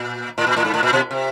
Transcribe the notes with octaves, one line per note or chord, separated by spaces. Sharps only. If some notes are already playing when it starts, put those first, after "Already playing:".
Already playing: A#2
A2
A#2
A2
G#2
A2
A#2
B2
C3